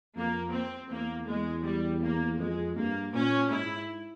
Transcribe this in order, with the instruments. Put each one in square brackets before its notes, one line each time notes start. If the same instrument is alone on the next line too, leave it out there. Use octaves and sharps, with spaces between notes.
[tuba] F2 [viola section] A#3
[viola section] C4
[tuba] E2 [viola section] A#3
[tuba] E2 [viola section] G#3
[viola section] G3
A#3
[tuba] F2 [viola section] G#3
[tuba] G2 [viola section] A#3
[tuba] A#2 [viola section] C#4
[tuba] G#2 [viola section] E4